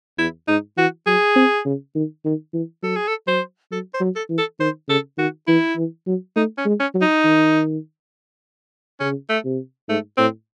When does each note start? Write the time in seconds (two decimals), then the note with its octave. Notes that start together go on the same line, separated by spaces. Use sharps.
0.18 E2 E4
0.48 G#2 D#4
0.77 E3 F#4
1.07 F#3 G#4
1.36 C4
1.65 C#3
1.95 D#3
2.25 D#3
2.53 E3
2.83 F#3 A4
2.96 G#4
3.08 A4
3.27 F#3 C5
3.72 F#3 A4
3.94 C5
4.00 F#3
4.16 A4
4.29 E3
4.38 A4
4.59 D#3 C5
4.88 C#3 A4
5.18 D#3 F#4
5.47 E3 E4
5.76 E3
6.07 F#3
6.36 A3 D#4
6.58 C#4
6.65 G#3
6.80 C#4
6.95 F#3
7.01 D#4
7.25 D#3
9.00 C#3 C#4
9.29 A3
9.45 C3
9.88 G#2 A3
10.17 A2 C4